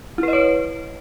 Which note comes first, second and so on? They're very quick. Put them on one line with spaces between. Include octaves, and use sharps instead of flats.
E4 B4 D#5 C#5